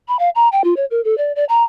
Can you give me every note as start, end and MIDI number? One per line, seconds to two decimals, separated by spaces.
0.08 0.17 83
0.19 0.29 77
0.35 0.49 82
0.52 0.62 79
0.64 0.74 65
0.76 0.85 73
0.91 1.03 70
1.04 1.17 69
1.18 1.32 74
1.36 1.45 74
1.49 1.64 82